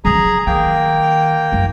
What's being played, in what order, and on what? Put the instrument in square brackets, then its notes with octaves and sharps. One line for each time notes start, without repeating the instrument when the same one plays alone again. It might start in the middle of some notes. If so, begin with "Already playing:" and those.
[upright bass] C#3 F#3 [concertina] G#4 A#5
[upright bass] D#3 [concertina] A#3 G5
[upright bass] F#1